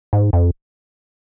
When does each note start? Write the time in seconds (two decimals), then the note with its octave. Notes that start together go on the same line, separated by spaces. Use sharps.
0.13 G#2
0.33 F2